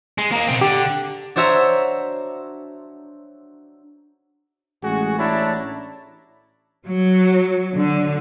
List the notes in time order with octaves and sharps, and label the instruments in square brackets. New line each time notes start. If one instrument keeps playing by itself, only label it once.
[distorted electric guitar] G#3
A#3 D#4
B2 C4
[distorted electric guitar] D3 [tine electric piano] G4
[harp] D4 F#4 C5 C#5 E5 A#5
[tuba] A1 [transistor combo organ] G#3 G#4 [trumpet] F#4
[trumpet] D4 [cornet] E4 [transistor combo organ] C#5 A5 A#5
[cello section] F#3
D3